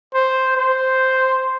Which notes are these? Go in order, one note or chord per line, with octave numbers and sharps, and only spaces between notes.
C5
C5